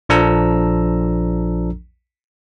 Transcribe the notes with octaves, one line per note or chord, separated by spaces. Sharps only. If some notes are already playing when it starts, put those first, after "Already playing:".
A#1 F3 D4 A4 A#5 E6